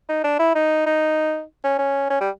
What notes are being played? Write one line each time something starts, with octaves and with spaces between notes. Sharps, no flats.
D#4
D4
E4
D#4
D#4
C#4
C#4
C#4
G3